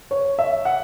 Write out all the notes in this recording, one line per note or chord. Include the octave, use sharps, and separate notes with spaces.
C#5
E5
F#5